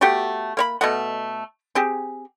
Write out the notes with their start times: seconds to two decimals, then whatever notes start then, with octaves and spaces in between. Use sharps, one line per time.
0.01 A3 B3 F#4 G4
0.57 A#3 C#5 B5
0.81 B2 A3 D#5 F#5
1.75 C4 G4 G#4